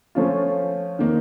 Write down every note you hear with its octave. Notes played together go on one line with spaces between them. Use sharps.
F3 A3 C#4 F4
D#3 A#3 D#4